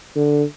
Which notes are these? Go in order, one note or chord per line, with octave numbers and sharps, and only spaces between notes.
D3